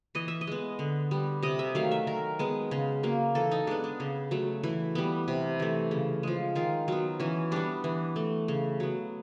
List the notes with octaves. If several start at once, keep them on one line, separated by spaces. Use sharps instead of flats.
E3 D#5
E5
D#5
G#3 B3
D3
G3 B3
C3 D#5
E5
D#3 F#3 A3 F5
E5
D#3 A#4
G#3 B3
C#3
F#3 A#3
E3 A4
D#4
G#3 B3 D4
D4
C#3
F#3 A3
E3 E4
G3 B3
C3
E3 A3
C#3
F3 G#3
D#3 F4
F#3 B3
E3 C#4
G3 B3 D4
E3
A3
C#3
F#3 B3